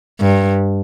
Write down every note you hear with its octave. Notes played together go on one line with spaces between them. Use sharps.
G2